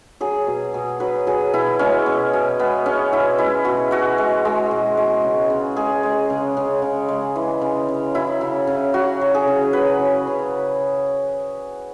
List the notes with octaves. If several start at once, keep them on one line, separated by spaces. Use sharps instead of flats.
F#3 G#4
B2
B2
F#3 B4
F#3 G#4
B2 E4
G#3 C#4
B2
B2
G#3 B3
G#3 C#4
B2 E4
G#3 E4
B2 F#4
B2 F#4
G#3
G#3
B2
G#3
C#3
C#3
G#3 G#4
G#3
C#3
C#3
C#3
G#3
E3
C#3
C#3
F#3 E4
C#3
C#3
F#3 F#4
F#3
G#4
C#3
F#3 B4
C#3
C#3